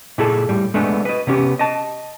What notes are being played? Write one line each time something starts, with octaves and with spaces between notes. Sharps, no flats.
A#2 E4 G#4 A4
A2 G3
G#3 A3 B3 D4
B4 D#5
C3 B3 C#4 G4
D#5 A5